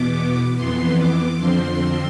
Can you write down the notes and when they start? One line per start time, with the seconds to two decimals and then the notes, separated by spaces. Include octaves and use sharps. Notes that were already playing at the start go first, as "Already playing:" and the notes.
Already playing: E2 B2 B3 D6
0.55 F2 E3 B3 C6
0.97 D6
1.37 F2 D3 F3 C4 C6